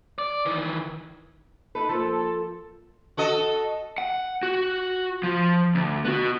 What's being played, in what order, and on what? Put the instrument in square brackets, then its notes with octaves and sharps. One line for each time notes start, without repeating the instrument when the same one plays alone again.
[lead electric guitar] D5
D#3 E3
[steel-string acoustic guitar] D#4 A4 [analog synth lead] B4
[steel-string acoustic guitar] F3 A#3 [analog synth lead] A4
[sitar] F#4 A4 D#5
[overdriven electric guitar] F#5
F#4
F3
D2
B3 F#4